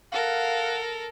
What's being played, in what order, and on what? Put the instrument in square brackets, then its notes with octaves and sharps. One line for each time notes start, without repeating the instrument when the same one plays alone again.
[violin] A4 A#4 [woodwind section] F5 F#5